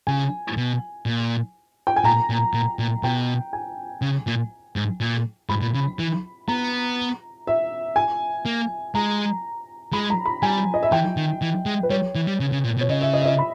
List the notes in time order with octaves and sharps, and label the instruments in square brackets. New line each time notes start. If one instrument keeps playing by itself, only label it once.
[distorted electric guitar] C#3 [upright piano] G#5
[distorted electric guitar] B2
A#2
[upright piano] G5
G#5
[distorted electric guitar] A#2 [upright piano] A#5
[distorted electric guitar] A#2
A#2
A#2
[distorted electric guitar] B2 [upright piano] G5
[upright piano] G#5
[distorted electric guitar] C#3
A#2
G#2
A#2
[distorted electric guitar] G#2 [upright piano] B5
[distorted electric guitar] A#2
C#3
E3
[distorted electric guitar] B3 [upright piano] A#5
[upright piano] E5
G#5
[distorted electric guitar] A#3
[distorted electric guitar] G#3 [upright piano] A#5
[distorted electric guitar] G#3 [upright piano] B5
[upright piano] A#5
B5
[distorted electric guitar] G3 [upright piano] G#5
[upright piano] D#5
E5
[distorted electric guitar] E3 [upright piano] G5
[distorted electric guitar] D#3
E3
G#3
[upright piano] B4
[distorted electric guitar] G3 [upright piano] C#5
[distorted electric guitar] E3
G3
C#3
C#3
A#2
B2
[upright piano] C#5
[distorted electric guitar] C#3 [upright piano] D#5
[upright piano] E5
D#5
E5
D#5
B5